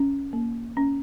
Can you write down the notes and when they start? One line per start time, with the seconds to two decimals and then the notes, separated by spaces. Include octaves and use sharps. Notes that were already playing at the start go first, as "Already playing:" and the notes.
Already playing: C#4
0.33 A#3
0.77 C#4